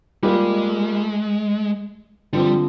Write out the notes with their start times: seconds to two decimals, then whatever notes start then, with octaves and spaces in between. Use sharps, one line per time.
0.23 G3 G#3 A#3 F4
2.33 D3 F3 G3 C4